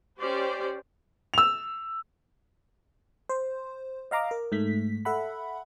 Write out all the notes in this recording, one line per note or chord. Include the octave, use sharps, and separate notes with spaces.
C#4 G4 C5 D5
E6 F7
C5
D#5 F5 A#5 D6
A#4
G#2 A3 B6
A4 E5 F#5 B5